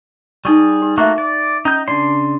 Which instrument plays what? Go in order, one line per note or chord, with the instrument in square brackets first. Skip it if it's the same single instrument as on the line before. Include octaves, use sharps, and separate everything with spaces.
[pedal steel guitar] G3 G#4 [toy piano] D#4 C#6
[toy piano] G4
[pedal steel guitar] A3 A#3 F#4 [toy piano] E5 C#6
[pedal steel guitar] D5
[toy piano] C#4 [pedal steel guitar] D#4 G6
[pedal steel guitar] C#3 D4 C6 [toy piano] D5